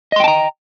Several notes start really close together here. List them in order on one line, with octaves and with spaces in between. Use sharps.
D#5 C6 G5 A5 A#5